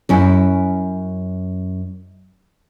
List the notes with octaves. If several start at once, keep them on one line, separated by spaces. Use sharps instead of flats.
F#2 C#4 E4